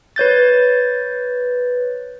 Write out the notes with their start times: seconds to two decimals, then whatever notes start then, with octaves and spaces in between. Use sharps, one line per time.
0.16 B4 C#5 G6 A6